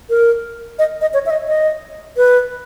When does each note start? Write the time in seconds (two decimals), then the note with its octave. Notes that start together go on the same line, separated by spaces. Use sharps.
0.10 A#4
0.79 D#5
1.01 D#5
1.14 C#5
1.26 E5
1.30 D#5
1.48 D#5
2.17 B4